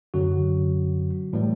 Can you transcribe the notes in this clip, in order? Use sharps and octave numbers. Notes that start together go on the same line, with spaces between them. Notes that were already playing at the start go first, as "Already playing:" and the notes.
F#2 D3 F#3 F#4
A2 E3 G3